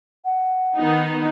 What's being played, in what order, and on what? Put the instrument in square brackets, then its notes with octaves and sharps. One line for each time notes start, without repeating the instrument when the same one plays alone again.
[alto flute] F#5
[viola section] D#3 B3 D#4